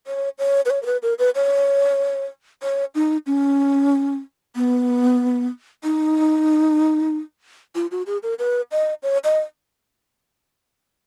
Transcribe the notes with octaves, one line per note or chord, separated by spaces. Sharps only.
C#5
C#5
B4
C#5
A#4
B4
A#4
B4
C#5
C#5
D#4
C#4
B3
D#4
F4
F#4
G#4
A#4
B4
D#5
C#5
D#5